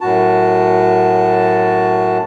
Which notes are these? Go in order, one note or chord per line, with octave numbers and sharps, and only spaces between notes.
F#2 A2 F#4 A5